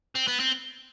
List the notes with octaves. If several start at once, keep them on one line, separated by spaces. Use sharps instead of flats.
C4
B3
C4